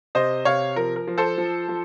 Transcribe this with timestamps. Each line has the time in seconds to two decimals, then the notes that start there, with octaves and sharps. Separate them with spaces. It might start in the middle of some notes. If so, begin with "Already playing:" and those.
0.15 C3 C5 D#5
0.45 C3 C#5 F5
0.76 F3 A#4
0.96 A#4
1.07 F3
1.18 A4 C5
1.38 F3
1.68 F3